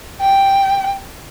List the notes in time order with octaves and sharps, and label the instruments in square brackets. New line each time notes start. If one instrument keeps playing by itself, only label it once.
[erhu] G5